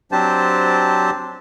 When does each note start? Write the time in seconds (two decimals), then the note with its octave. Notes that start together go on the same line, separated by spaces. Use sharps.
0.12 F#3 C4 D4 G4 C5 A5